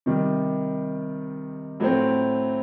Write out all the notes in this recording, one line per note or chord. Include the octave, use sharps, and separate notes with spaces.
C3 D#3 G3
A2 F#3 A3 C4